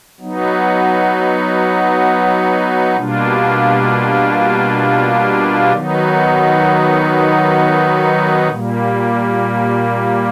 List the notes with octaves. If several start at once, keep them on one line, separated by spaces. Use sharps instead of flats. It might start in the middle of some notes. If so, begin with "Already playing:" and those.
F#3 B3 D#4
B2 G3 A#3 D4 F4
D#3 F#3 B3 D#4
A#2 G3 A#3